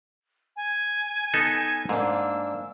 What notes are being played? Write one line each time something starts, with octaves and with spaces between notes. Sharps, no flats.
G#5
B3 D#4 A4
G#2 A#3 D4 E6